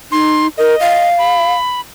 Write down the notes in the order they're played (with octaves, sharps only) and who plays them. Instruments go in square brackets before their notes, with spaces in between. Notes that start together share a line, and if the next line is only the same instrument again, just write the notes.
[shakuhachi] D#4 [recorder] C6
[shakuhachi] A#4 [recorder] D#5
[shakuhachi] F5
[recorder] B5